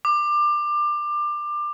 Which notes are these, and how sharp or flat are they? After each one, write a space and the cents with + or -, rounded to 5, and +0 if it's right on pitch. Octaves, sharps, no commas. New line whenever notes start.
D6 +25